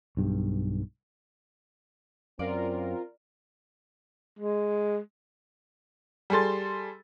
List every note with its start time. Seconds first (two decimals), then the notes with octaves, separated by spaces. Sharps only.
0.17 B1 G2
2.39 F#2 C4 F4 A#4 D5
4.39 G#3
6.30 G3 G#4 A4 C6 A6